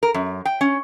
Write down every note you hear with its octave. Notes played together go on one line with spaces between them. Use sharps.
A#4
F#2
G5
C#4